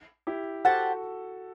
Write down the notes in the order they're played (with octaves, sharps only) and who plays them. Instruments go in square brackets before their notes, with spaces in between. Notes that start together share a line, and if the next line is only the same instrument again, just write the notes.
[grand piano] E4 G4
[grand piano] F#4 A4 [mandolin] G4 C5 F#5 A5